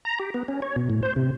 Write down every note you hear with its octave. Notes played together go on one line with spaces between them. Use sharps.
A#5
G4
B3
C#4
C#5
B2
A2
C5
C3